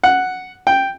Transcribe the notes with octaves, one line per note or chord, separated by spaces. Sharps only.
F#5
G5